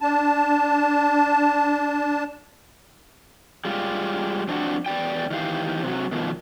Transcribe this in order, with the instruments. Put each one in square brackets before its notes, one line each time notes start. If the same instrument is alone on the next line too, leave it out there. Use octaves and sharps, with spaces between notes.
[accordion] D4 A5
[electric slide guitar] G3 G#3 F4 G4
F2 C4 D4 E4 F#4
E2 D5 G5
D#3 E3 G4 F5
C3 F#3
B2 D#3 F3